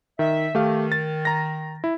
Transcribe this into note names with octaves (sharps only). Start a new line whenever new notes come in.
D#3 E5
D#3 A3 G4 F5
A6
A#5 A#6
E4